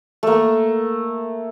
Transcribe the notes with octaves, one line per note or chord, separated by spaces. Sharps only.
A3 A#3